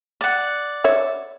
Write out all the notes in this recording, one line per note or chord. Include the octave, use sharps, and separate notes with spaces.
D5 F#5
C#5 E5